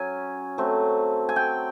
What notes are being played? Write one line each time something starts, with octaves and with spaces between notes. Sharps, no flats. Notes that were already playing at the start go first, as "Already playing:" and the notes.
Already playing: F#3 C#4 G#5
F#3 A3 C4
G#5
G5